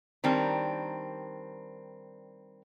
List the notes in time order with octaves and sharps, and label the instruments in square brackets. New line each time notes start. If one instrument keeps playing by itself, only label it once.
[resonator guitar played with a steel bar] D#3 G3 C4 D4 A#4